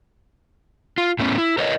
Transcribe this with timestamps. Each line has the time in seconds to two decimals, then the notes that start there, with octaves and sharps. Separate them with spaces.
0.98 F4
1.19 A2 A3 B3 C#4
1.38 E4
1.58 A#4 B4 C#5 D#5